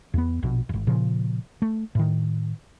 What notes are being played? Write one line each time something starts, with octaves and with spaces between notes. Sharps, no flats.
E2 B3
A#1 B2
D#1 G#1
A#2 C#3 F3
A3
A2 D#3